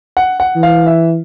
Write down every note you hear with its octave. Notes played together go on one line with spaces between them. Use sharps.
F#5
F#5
E3
F5
E5